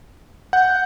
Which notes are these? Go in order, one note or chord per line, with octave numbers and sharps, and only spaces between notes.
F#5 G6